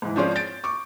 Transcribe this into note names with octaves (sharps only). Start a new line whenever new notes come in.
G#2 E3
F3 G#3 C4 C#4 C5 D5
G6 A6 D7
C#6 D6